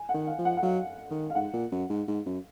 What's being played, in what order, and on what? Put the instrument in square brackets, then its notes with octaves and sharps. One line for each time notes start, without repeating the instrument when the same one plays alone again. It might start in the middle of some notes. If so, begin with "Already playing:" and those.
Already playing: [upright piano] G#5
F#5
[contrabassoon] D#3
[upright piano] F5
[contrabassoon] F3
[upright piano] F#5
F#5
[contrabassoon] F#3 [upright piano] F5
[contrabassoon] D#3
[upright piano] F5
[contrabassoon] G#2 [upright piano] F#5
[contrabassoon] A#2
F#2
G#2
G#2
F#2